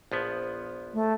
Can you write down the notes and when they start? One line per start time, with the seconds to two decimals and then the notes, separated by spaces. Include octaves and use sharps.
0.12 A#1 F3 B3
0.94 A3